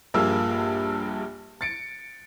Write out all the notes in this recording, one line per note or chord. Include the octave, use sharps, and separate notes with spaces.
A#1 G2 A#3 F4 G#4 E6
A6 C#7 D7